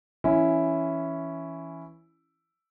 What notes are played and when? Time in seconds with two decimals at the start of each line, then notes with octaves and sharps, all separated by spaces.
0.24 E3 C#4 E4